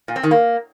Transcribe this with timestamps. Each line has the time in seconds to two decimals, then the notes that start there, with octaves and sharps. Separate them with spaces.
0.08 A#2
0.16 C4
0.23 D#3
0.31 A#3